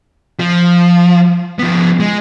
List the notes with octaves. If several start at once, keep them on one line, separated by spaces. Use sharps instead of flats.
F3
F3 B3
G#3